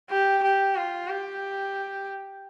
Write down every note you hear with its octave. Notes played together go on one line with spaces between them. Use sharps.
G4
G4
F4
G4